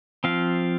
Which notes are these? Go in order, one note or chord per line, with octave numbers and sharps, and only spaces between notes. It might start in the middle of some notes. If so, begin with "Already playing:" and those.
F3 C4 F5